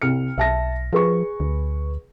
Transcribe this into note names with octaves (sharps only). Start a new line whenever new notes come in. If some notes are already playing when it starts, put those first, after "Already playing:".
C2 F6 C#7
B1 E5 A5 A#6
F3 G#4 B4 C#6
D2